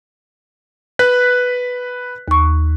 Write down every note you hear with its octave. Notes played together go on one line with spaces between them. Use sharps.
B4 F#6 B6
D#2 C#6